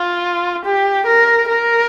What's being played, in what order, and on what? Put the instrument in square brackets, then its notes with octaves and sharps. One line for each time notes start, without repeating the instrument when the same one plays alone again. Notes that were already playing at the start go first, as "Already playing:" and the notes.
Already playing: [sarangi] F4
G4
A#4
A#4